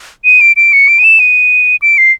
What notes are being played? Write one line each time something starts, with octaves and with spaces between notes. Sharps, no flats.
D#7
D7
D7
C#7
D7
D#7
E7
D#7
D7
C7